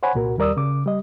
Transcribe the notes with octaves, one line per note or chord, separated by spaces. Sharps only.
C5 C#5 F#5 G#5 B5
C2 A#2 F#4 A#4
D#2 G3 A#4 D5 D#6 E6
C#3 D6
G3 D#5